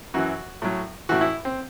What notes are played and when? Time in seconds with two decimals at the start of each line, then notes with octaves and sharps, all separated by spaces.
0.14 F#2 E3 F#4
0.62 A2 F#3
1.09 A2 E3 F#4
1.21 E4
1.45 C4